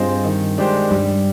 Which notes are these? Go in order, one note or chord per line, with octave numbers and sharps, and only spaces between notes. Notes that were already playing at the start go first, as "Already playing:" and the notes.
Already playing: G2 C4 F4 G#4 C5 D#5
D#3
G#3 D4 G4 C5
G2 G3